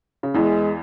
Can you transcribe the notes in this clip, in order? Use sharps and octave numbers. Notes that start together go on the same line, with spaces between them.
C#3
E2 E3 G#3